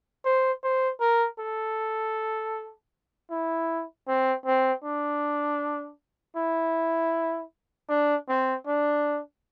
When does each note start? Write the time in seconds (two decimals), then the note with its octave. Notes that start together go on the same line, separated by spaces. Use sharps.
0.25 C5
0.63 C5
1.00 A#4
1.39 A4
3.30 E4
4.07 C4
4.46 C4
4.84 D4
6.36 E4
7.89 D4
8.28 C4
8.67 D4